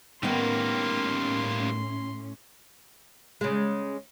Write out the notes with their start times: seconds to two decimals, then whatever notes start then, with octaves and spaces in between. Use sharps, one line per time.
0.23 A2 D#3 G3 A#3 B3 C#4 C6
3.41 C#3 G#3